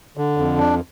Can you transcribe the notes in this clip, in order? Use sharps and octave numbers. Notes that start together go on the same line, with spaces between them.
D3
F2
D4